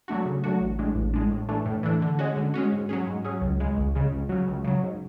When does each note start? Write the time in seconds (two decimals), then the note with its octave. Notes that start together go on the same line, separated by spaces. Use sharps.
0.08 F#3 A3 D4 F#4
0.26 C#3
0.44 F#3 A3 D4 F#4
0.61 A1
0.79 A2 G#3 D4
0.95 A1
1.14 A2 G#3 D4
1.31 A2
1.49 E3 A3 D4
1.66 A2
1.83 E3 A3 D4
2.02 D3
2.19 G#3 C#4 F#4
2.37 D3
2.54 G#3 C#4 F#4
2.72 G#2
2.89 F#3 C#4 G#4
3.07 G#2
3.25 F#3 C#4 G#4
3.42 C#2
3.60 C#3 G#3
3.77 C#2
3.95 C#3 G#3
4.12 C#2
4.29 C#3 F#3
4.48 C#2
4.64 C#3 F#3
4.83 G#2